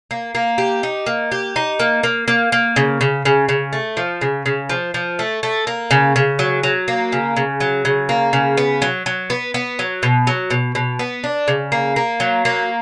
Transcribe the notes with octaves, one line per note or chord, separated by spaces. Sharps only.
A#3
A#3
G4
D#4
A#3
G4
D#4
A#3
A#3
A#3
A#3
C#3
C#3
C#3
C#3
A3
F3
C#3
C#3
F3
F3
A3
A3
A#3
C#3
C#3
F#3
F#3
A#3
C#3
C#3
F#3
C#3
A#3
C#3
B3
F#3
F#3
B3
B3
F#3
B2
F#3
B2
B2
B3
D4
C#3
A#3
A#3
F#3
A#3